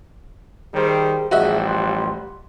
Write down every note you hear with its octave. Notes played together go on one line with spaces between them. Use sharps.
D#3 G3 G#4 C5
A1 F3 G3 F#4 G#4 D#5 E5
C6